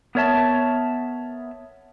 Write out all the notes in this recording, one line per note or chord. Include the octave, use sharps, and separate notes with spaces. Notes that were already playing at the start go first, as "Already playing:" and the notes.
B3 A#4 C#5 E5 A5